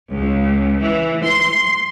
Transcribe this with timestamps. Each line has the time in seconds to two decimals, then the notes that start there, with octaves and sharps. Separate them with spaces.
0.12 C#2
0.81 E3
1.24 C6